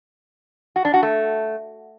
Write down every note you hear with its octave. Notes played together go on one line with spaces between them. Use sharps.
F#4
D4
F#4
A3